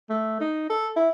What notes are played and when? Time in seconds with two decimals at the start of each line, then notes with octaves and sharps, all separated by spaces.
0.10 A3
0.41 D#4
0.70 A4
0.96 E4